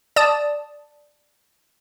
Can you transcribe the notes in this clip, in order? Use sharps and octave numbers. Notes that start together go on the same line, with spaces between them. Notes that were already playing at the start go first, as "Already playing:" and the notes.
D5 A5 D#6